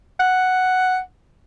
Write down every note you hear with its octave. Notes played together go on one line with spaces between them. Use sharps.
F#5